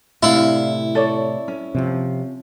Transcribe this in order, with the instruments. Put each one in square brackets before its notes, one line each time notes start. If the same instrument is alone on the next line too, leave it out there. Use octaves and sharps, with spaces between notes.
[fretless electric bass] A2 C3 [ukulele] D4 D5 F5 [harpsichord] E4
[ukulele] A4 C#5 D5
C#4
[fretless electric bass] C3 F3